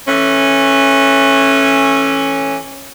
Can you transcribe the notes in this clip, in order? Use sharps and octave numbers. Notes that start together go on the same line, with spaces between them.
E3 A3 C#4